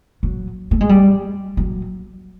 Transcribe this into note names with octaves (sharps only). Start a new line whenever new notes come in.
F#3
A3
G#3
G3
F#3